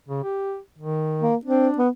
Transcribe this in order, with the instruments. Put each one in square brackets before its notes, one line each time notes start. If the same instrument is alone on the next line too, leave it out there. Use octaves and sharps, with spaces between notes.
[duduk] C#3
G4
D#3
[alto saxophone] A#3
[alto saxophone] C4 [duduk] D4
[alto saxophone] B3